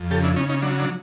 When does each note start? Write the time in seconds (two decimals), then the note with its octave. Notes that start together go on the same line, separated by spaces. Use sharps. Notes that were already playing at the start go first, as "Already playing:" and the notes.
Already playing: F2
0.11 C#3 G4 A4
0.23 D4 E4
0.36 C#3 C#4 D#4
0.50 C#4 D#4
0.62 F#3 D4
0.79 D4